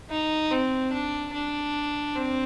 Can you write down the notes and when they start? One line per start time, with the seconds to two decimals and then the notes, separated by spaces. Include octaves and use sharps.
0.10 D#4
0.51 C4
0.93 D4
1.34 D4
2.15 C4